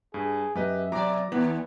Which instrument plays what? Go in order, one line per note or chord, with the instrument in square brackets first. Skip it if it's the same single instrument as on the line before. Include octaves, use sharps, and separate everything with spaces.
[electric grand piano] G2 [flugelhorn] G#4
[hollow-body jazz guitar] F#2 [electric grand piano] G4 B4 D#5 [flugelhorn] E5
[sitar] B2 D5 [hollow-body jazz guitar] F#3 [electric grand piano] A#5 D6
[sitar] D#2 [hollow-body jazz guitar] E3 B3